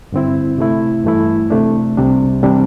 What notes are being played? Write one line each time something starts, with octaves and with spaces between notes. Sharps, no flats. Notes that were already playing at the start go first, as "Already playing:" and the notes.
G2 D3 C4 E4
C3 A3 E4
G2 E3 A3 E4
C3 A3 D4
C2 C3 G3 D4
C3 E3 G3 D4